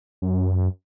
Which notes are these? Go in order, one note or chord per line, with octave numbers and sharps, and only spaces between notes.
F#2